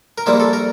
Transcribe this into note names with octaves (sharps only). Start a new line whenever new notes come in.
A#4
A#1 A#2 G3 A#3 E4 C5
A4
A#4